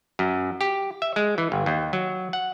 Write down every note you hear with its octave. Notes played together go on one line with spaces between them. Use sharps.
F#2
G4
E5
G#3
E3
G1
D#2
F#3
F#5